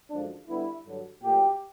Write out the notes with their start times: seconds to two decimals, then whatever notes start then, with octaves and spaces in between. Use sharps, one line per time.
0.10 F#2 D3 F3 G#3 D4
0.48 D3 G3 B3 E4
0.85 G2 D3 F#3
1.22 A#2 F#3 A3 G4